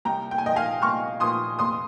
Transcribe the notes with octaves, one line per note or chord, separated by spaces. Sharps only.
C2 G5 A#5
G5
G#5
A#2 F3 D#5 G5
F5 G#5
C2 C#6 F6
A#2 F3 C6 D#6
F1 C6 D#6